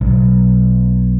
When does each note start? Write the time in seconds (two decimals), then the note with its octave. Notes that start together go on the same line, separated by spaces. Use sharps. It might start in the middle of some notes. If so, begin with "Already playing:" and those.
0.01 B1